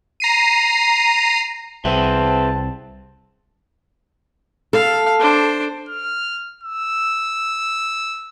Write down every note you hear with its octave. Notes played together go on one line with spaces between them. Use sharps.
A#5 C7 D#7
C2 C4 G#4 B4 E5 A5
A4 F5
D4 C5
F6
E6